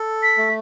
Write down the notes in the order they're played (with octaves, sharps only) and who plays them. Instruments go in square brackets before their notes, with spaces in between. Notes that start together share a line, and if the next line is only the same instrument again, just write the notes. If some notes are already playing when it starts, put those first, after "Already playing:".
Already playing: [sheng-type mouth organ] A4
[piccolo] B6
[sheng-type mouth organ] A3